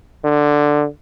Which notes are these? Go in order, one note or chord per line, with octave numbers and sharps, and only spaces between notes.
D3